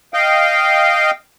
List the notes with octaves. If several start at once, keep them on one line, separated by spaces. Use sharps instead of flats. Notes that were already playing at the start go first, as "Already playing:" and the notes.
D#5 F5 G5